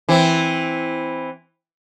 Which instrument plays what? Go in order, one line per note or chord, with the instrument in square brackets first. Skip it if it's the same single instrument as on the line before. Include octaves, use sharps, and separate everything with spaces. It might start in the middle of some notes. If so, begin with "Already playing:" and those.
[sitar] E3 C4